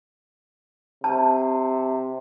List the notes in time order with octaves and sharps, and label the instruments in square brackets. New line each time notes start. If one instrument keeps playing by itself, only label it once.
[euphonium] C3 [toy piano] A5